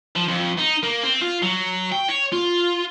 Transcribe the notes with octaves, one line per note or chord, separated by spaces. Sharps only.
F3
F2
D#4
A#3
C4
F4
F#3
G5
C#5
F4